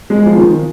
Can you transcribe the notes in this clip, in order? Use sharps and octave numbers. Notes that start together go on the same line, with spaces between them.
G#3
F3
D#3